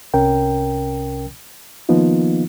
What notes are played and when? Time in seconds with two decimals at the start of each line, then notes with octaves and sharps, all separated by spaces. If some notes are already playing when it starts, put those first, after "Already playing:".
0.14 C2 C3 C#4 A#4 G5
1.89 D#3 F3 A#3 B3 D#4 F4